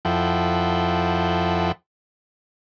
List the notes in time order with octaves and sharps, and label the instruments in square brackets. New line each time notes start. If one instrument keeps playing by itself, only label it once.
[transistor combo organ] F2 F3 E4 A4 F#5 G5